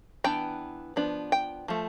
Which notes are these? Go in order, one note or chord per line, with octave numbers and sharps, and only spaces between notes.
E3 B3 D4 G5
F3 B3 D4
G5
F3 A3